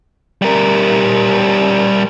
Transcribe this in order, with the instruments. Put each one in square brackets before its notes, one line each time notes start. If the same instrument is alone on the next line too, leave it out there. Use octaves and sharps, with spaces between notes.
[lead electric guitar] G3 A#4